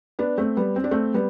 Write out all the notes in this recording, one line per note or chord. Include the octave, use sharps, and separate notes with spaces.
B3 D4
A3 C4
G3 B3
C4
D4
A3 C4
G3 B3